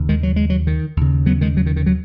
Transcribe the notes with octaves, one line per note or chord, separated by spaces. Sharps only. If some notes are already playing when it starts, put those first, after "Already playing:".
Already playing: D#2 C#3
D#3 G#3
F#3
G#3
F#3
D#3
D#2 C#3
F#3 B3
D#3 G#3
F#3
D#3
D#3
F#3